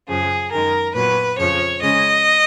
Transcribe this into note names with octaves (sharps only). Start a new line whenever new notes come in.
F#2 C#3 F3 G#4
F#2 D#3 G#3 A#4
A#2 F#3 B3 B4
F2 C#3 F3 C#5
C#3 G#3 C#4 D#5